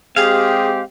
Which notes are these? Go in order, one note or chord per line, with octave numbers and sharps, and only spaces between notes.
G#3 C4 G4 G#4 F5